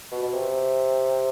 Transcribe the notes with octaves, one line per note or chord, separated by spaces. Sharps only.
B2
B2
C3